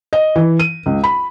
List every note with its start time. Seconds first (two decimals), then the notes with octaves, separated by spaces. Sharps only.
0.13 D#5
0.36 E3
0.59 D#7
0.86 C#2
1.04 B5